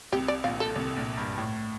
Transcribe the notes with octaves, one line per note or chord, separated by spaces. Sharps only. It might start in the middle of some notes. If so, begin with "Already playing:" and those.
C2 C3 G4
D5
A#1 A#2 F5
A4
C2 C3
A#1 A#2
G2
A2